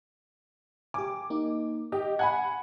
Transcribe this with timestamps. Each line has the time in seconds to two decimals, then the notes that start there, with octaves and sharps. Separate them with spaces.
0.94 G4 G#5 D6
1.30 A#3 D#4
1.92 G4 D#5
2.19 F#5 G#5 B5 G#6